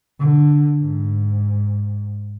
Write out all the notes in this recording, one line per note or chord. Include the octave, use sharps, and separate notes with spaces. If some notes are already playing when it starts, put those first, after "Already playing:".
D3
G#2